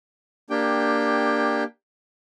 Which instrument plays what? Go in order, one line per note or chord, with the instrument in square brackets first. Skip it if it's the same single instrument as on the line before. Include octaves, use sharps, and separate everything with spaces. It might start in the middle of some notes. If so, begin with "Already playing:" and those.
[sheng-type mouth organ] A#3 D4 G4 G5